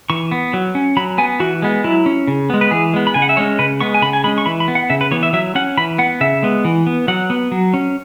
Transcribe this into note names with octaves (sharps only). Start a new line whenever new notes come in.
E3 C#6
B3
F#3
C#4
F#3 B5
B3 G#5
E3 F#4
G#3 B3
F#3 E4
C#4
C#3
G#3 B3
B4
E3 G#4
G#3 B3
B5
C#3 G#5
F#5
E5
G#3 C#4 C#5
C#3 B4
G#3 B3 C#6
G#5
C#3 B5
G#5
G#3 C#4 B5
C#6
E3 B5
B5
B3
F#5
C#3 E5
B4
E3 B3 C#5
E5
F#3 E5
C#4 F#5
E3 B5
B3 F#5
C#3 E5
G#3 B3
E3
B3
F#3 F#5
B3
F#3
C#4